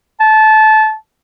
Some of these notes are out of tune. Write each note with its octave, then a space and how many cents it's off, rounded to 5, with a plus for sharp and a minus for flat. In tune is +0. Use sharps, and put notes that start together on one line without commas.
A5 -20